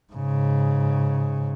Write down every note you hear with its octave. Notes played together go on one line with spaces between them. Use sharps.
G#2 C#3